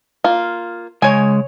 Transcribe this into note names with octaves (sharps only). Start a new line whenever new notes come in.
A#3 F4
C#3 G#3 C#5 G#5